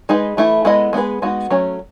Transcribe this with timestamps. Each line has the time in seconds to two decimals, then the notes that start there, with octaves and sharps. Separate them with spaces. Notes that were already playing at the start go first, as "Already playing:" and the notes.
0.09 G#3 D#4 G#4 B4
0.37 E3 A3 E4
0.65 G#3 B3 E4 A4 D#5
0.93 G#3 B3 E4 G#4 B4
1.22 G#3 B3 D#4 F#4
1.50 F#3 A3 C#4